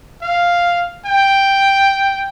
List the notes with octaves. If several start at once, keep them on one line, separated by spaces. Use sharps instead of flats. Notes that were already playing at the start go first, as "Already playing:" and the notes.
F5
G5